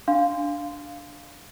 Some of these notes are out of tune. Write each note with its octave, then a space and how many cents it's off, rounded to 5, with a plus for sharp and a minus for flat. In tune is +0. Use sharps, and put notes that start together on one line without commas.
D4 +0 F5 +0 C6 -15